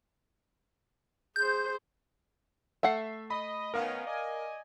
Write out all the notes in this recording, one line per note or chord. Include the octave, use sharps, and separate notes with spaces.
G#4 C5 G6
A3 E5 F#5 C7
D#5 B5
D#3 B3 C#4 A#4 F5
D5 D#5 G#5